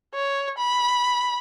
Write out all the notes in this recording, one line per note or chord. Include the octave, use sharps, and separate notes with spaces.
C#5
B5